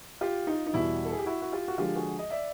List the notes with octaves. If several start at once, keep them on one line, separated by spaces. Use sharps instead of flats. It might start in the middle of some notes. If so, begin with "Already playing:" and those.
F4 G4
D#4 F4
D#4
E2 B2 G3 E4
A4
G#4
G4
E4 F#4
F#4
F4 G4
F#4
D3 F3 G#3 F4 G4
F#4 G#4
D#5
D5 E5